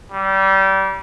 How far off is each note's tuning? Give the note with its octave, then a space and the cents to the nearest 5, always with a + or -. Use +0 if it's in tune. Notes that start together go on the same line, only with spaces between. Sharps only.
G3 -25